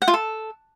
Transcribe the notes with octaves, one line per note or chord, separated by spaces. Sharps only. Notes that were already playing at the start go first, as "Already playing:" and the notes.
F#5
F4
A4